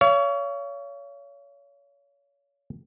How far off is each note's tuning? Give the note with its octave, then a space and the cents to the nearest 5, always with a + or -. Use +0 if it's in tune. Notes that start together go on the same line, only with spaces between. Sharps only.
C#5 +30 F5 -35